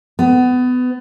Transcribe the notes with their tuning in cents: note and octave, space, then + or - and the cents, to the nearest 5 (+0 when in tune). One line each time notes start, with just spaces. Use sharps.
B3 +25